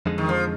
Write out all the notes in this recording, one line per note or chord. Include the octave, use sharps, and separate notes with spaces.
F2 D3 G#3 D#4
D#3
F3